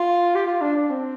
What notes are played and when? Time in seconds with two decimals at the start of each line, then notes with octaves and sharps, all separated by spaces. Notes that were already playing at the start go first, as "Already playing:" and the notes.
Already playing: F4
0.35 G4
0.47 F4
0.61 D4
0.76 D4
0.90 C4